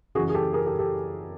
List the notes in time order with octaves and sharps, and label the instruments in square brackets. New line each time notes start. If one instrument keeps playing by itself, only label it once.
[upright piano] F#2 C#3 E3 F#4 G#4
G#4
G4 A4
G#4 A#4
G4 A4
G4 A4